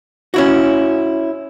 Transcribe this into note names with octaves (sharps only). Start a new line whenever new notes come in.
C#4 E4 F#4